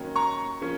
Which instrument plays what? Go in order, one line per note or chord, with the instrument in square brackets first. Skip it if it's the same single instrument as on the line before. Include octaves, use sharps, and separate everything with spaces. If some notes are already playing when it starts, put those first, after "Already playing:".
Already playing: [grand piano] D#2 D#3 F#3 A#3 C#4
[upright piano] A#5 C#6
[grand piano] F3 A#3 C#4